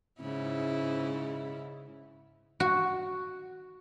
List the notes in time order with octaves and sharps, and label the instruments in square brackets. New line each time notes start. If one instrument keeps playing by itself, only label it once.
[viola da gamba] G#2 C#3 E4
[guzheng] F#4